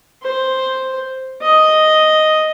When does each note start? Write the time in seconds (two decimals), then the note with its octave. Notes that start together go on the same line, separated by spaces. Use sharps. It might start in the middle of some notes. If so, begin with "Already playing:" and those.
0.22 C5
1.42 D#5